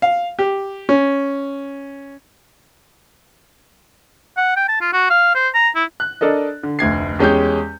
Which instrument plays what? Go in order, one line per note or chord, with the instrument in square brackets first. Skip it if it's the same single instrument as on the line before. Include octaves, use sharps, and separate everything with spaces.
[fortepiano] F5
G4
C#4
[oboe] F#5
G5
A5
F4
F#4
F5
C5
A#5
E4
[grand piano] F#6
D4 A4 A#4 D#5
D3
F1 D2 G#6 C7
E2 G#3 C#4 G4 G6